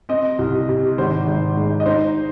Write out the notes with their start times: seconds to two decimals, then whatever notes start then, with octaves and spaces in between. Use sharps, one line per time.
0.09 C4 D#5
0.39 C2
0.69 C3
0.98 G#1 C5
1.27 G#1
1.57 G#2
1.80 D#5
1.86 D#4 C5